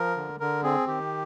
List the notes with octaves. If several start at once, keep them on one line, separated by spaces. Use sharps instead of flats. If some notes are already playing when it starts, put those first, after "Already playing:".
Already playing: F3 A#4
D3
D3 A#4
C4 G#4
D#3 G4